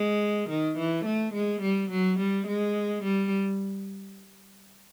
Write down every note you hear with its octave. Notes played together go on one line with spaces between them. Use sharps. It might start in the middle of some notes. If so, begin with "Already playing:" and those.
Already playing: G#3
D#3
E3
A3
G#3
G3
F#3
G3
G#3
G3